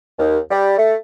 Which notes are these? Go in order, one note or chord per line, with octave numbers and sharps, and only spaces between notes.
D#2
G3
A3